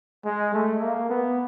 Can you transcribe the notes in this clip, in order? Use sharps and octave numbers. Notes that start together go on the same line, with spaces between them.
G#3
A3
A#3
B3